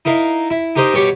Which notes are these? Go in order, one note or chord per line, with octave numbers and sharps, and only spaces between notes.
D#4 E4 A#4 F5
E4
D#4 G4 A#4 C5 D#5
B2 G3 C#5 C#6 D6